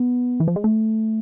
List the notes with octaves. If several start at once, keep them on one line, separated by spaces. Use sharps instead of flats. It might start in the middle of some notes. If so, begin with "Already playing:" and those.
Already playing: B3
E3
F3
G#3
A3